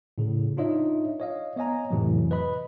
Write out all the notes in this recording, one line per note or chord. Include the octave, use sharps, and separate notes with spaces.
A2 C#3
D4 D#4 F4 C#5 D#5 E5
C#5 D#5 F5
B3 C#5 D#5 G#5 A#5
F2 A2 C3 E3 F#3
B4 D#5 B5